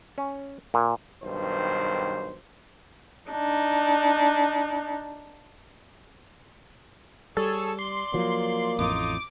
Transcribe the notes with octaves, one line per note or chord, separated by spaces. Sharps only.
C#4
A#2
B1 G2 D#3 C5
D4 D#4
G3 G#4 A4 C#5
D5 C6
F3 F#3 A#3
A1 F2 A2 D#4 F4 D6 D#6